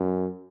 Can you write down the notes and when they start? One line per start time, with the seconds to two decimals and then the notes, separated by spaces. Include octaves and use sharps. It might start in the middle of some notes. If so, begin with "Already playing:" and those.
Already playing: F#2